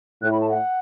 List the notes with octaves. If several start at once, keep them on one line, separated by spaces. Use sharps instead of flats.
A2 F#6
B5
A5
F#5